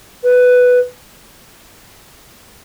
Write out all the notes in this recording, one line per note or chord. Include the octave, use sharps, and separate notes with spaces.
B4